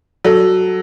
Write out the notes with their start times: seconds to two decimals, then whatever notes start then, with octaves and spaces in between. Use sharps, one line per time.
0.24 F#3 A4